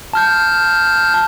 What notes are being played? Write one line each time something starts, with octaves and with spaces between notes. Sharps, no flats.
A5 F6 G6